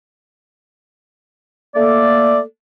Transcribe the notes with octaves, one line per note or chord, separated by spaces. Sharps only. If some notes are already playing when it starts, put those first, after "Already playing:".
A3 A#3 A4 D5